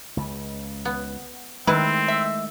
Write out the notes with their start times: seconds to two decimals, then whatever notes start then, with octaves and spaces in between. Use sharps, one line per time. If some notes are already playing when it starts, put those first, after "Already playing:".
0.17 C#2 C#3
0.85 B3
1.67 D#3 G#3 A3 C4 E4 B4
2.08 E5